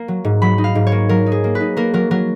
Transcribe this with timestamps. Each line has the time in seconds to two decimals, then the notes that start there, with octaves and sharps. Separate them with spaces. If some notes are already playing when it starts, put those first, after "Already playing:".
Already playing: A#3
0.08 F#3
0.24 G#2
0.42 F#3 B5
0.58 D#4
0.64 F5
0.75 G#2
0.87 C#5
0.92 A#3
1.09 F#3 A#4
1.26 D#4
1.32 G#4
1.44 A#3
1.55 B4
1.60 D#4
1.77 A#3 A#4
1.94 F#3 A#4
2.11 F#3 A#4